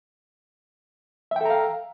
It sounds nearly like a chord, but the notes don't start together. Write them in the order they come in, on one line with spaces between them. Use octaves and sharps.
E5 G5 A4 A#5 F5